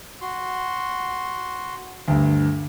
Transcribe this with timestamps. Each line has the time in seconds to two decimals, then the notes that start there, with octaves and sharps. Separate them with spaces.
0.21 F#4 C6
2.08 D2 G2